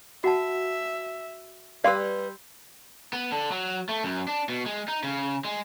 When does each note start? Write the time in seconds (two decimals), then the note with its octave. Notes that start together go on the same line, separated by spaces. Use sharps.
0.24 F#4 E5 F#5 A5
1.84 G3 B4 D5 F5 C6 E6
3.13 B3
3.32 D3
3.51 F#3
3.89 A3
4.04 F#2
4.28 D4
4.49 B2
4.66 G#3
4.88 D#4
5.04 C#3
5.45 G#3